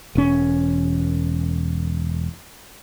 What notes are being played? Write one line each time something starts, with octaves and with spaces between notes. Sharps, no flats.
E1 C#4